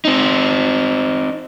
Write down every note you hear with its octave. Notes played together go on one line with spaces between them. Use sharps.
C4 D#4